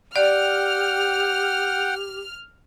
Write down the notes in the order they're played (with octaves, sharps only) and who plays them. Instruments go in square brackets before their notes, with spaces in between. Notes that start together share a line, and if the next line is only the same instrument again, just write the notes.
[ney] G4 [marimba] D5 [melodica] F#5 G5 [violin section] F6